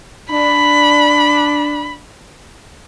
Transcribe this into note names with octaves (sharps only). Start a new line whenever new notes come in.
D4 B5